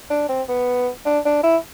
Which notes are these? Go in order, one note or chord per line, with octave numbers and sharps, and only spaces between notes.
D4
C4
B3
D4
D4
E4